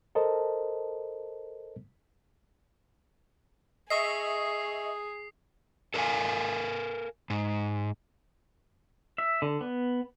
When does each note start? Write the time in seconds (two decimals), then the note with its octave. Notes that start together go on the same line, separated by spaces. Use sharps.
0.15 A4 A#4 C5 D#5 A5
3.90 G#4 D#5 E5 C#6 D#6 C7
5.94 A4 A#4 C#5 F5 G#5
7.30 G#2
9.18 E5
9.42 D3
9.61 B3